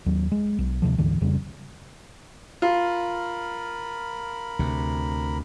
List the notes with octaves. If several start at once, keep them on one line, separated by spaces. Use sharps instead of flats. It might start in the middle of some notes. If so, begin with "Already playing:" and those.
D#2 F#3
G#3
B1
D2 C3 F3
D2 G#2 D3 E3
E1 F2 C#3 G3
F4 A#4 B5
D2 C3